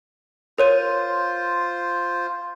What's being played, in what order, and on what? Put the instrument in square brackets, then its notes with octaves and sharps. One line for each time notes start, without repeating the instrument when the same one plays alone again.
[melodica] F4 C5 [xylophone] A#4 C#5 D#7